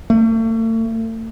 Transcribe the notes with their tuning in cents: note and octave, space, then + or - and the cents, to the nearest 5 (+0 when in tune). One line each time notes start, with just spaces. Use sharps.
A3 +40